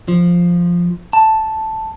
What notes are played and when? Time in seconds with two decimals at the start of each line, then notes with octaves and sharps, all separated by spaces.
0.08 F3
1.13 A5